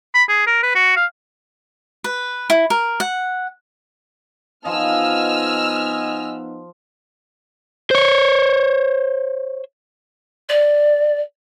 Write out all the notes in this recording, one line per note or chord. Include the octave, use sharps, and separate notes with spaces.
B5
G#4
A#4
B4
F#4
F5
B4
E4
A#4
F#5
F3 B3 D#4 D#5 G#5 E6 F6
C5 C#5
D5